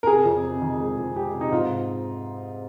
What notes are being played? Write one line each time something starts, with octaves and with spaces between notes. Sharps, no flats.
A#4
C3 G#4
F2
C3
D#3
G#3
F2
G#3 G4
C3
D#4
G#2 F4